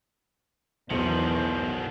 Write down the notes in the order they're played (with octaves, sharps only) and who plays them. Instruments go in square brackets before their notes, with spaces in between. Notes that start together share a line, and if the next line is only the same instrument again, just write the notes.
[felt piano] B1 C#7 [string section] E2 [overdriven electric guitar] B2 D#3 [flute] C5